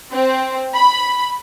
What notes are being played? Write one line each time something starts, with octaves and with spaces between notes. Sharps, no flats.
C4
B5